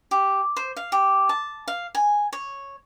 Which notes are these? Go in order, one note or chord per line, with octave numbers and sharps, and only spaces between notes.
G4
C5
F5
G4
A5
F5
G#5
C#5